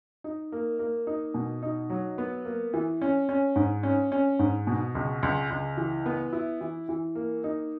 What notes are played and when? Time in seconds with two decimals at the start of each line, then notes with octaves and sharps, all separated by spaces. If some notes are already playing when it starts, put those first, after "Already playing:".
0.24 D#4
0.52 A#3
0.79 A#3
1.07 D#4
1.34 B2
1.63 D#4
1.90 F#3
2.18 B3
2.45 A#3
2.74 E3
3.02 C#4
3.29 C#4
3.56 G#2
3.83 C#4
4.12 C#4
4.39 G#2
4.67 B2
4.95 C#2
5.23 C#2
5.50 C#2
5.77 E3
6.06 B3
6.33 E4
6.61 E3
6.89 E3
7.15 A#3
7.44 D#4